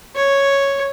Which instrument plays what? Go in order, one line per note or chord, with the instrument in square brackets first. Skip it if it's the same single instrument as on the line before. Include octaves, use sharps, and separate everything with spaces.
[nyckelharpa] C#5